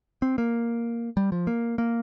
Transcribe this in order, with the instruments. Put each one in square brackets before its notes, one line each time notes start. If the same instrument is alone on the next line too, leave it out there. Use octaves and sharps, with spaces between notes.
[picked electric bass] C4
A#3
G3
F3
A#3
A#3